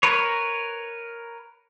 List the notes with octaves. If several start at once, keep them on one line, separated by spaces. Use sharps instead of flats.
A#4 B4 C#5